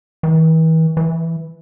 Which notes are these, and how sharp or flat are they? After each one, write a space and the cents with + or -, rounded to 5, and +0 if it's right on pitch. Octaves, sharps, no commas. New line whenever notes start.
E3 -40
E3 +0